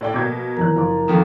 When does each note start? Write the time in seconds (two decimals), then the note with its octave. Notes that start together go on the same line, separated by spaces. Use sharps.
0.01 A2 D5 G5
0.14 B2 A#3 D6 G#6
0.57 G#1 E2 A#4 F#6
0.76 F#1 F3 D6
1.08 F2 D#3